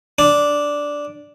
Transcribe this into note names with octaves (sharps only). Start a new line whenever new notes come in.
D4